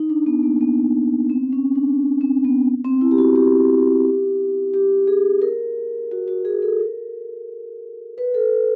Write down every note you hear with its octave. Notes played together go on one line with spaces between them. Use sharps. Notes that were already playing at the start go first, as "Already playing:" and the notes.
Already playing: D#4
D4
B3
A#3
B3
C4
C#4
D4
C4
B3
C4
E4
G4
F#4
G4
G4
G#4
A#4
F#4
F#4
G#4
A4
A#4
B4
A4